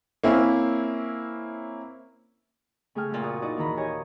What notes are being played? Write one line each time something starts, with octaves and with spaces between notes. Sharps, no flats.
A#3 C4 C#4 E4
C#3 A3 G#4 G5 F6
F#2 A#2
A#2 F#4 A#4 D5 D#6
D#4 E4 F#4 D5 D#5
D#2 A#2 D#3 E3 A#5 B5
D#4 G4 C#5 D#5 G#5